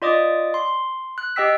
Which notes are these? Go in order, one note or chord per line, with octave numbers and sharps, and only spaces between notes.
F4 D5 D#5 D6 D#6
C6
F#6
G4 D#5 G5 E6 B6